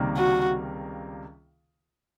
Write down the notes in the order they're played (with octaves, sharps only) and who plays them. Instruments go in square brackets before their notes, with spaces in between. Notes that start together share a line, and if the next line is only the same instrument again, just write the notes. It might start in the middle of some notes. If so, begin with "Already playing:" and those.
Already playing: [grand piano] C#2 C3 D#3 G3 A#3
[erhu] F#4